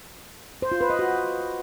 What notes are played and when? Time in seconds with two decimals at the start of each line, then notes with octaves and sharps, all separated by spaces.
0.62 C5
0.72 F4
0.81 B4
0.90 D#5
0.99 F#4